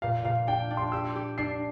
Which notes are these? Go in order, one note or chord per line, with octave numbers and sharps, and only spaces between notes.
A#2 F5
A#2 F5
D4 G5
D4
C6
G4 E6
G4
D4 C7